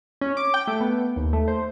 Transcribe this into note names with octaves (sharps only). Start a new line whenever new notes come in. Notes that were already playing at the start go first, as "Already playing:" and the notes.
C#4
D6
G5
A3
B3
D#2
A3
C5